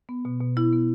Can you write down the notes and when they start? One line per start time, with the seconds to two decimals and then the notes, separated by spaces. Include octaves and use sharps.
0.09 B3
0.25 B2
0.41 B2
0.56 B3 E4
0.73 B3